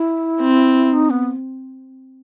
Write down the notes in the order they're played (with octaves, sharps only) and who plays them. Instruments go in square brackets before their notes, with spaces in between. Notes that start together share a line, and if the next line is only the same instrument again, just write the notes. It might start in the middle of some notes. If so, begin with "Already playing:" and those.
Already playing: [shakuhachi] E4
[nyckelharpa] C4
[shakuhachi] D#4
B3